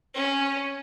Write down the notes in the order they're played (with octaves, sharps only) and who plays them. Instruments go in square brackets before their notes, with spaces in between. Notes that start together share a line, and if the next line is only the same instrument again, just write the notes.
[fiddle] C#4